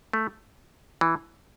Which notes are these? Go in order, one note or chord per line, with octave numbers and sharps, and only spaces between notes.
A3
E3